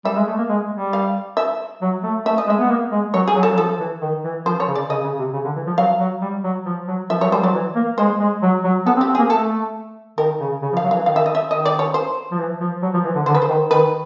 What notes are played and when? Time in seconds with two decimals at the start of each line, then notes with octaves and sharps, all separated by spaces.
0.05 G3 E5
0.16 G#3
0.27 A3
0.38 A#3
0.49 G#3
0.71 G3
0.93 F5
1.37 E5
1.82 F#3
2.04 A3
2.25 A3 E5
2.38 D#5
2.47 G#3
2.50 E5
2.59 B3
2.70 A#3
2.92 G#3
3.14 F#3 C#5
3.28 G#4
3.35 F#3
3.43 A4
3.52 F#3
3.57 F3 A4
3.80 E3
4.01 D#3
4.24 E3
4.46 F3 C5
4.60 C#5
4.68 C#3
4.75 D5
4.90 C#3 D#5
5.04 C#3
5.19 C3
5.33 C#3
5.44 D3
5.56 E3
5.67 F3
5.77 F#3 F5
6.00 F#3
6.22 G3
6.44 F#3
6.66 F3
6.88 F#3
7.10 F3 E5
7.21 F#3 C#5
7.31 G3 C5
7.43 F#3 D5
7.54 E3
7.76 A#3
7.98 G#3 C5
8.20 G#3
8.42 F#3
8.64 F#3
8.86 B3 A4
8.97 C4
9.01 G4
9.08 C4
9.15 G#4
9.19 A#3
9.30 A3 A4
10.18 D#3 A#4
10.40 C#3
10.62 C#3
10.73 F3
10.77 F5
10.84 F#3
10.91 F5
10.95 E3
11.06 D#3 F5
11.16 E5
11.26 D#5
11.35 E5
11.50 D#3 D#5
11.65 D5
11.79 C#5
11.94 C5
12.31 F3
12.38 E3
12.60 F3
12.82 F#3
12.94 F3
13.05 E3
13.15 D3
13.26 D3 C5
13.35 B4
13.42 C5
13.49 D#3
13.70 D#3 B4